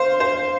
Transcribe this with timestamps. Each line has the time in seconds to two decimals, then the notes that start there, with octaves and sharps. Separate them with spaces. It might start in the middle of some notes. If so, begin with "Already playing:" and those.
Already playing: C5 F5
0.20 C5